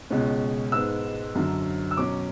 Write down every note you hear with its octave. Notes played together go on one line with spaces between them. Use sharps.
C#2 B2 G#3 C#4
G#2 G#3 B3 E6
F#2 D3 F#3
E6
B2 F#3 C#4 D6